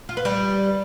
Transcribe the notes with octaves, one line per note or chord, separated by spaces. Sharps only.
F4
B4
G3